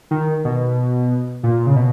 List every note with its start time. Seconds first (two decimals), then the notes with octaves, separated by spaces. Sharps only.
0.11 D#3
0.45 B2
1.43 A#2
1.66 C#3
1.76 B2